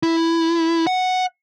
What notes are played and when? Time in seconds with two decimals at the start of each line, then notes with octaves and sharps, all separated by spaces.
0.03 E4
0.87 F#5